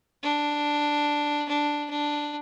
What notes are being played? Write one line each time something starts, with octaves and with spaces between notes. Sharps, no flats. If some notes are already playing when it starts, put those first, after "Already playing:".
D4
D4
D4